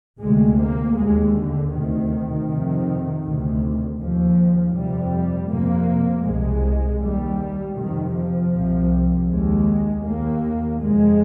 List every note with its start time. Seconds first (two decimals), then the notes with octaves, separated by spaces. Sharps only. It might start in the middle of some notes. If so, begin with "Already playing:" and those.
0.19 D2 C3 G#3
0.58 A#3
0.95 D#2 G#3
1.33 D3
1.70 D2 C3 D#3
2.46 F2 C3
3.23 D2 C3
3.98 D#2 F3
4.73 F2 C3 G3
5.49 F2 C3 A#3
6.25 C2 C3 G#3
7.00 D#2 G3
7.76 F2 C3 D#3
8.14 F3
8.53 C2 C3
9.28 D#2 G#3
10.03 D#2 A#3
10.80 F2 C3 G#3